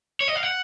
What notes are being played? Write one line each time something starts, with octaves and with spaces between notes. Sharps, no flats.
C#5
D#5
F5
F#5